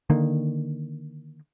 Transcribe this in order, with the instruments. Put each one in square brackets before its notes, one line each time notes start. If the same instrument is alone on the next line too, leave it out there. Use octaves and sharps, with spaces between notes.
[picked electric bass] D3 D#3 A#3